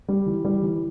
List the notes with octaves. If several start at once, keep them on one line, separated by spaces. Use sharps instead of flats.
G3
E3
G3
E3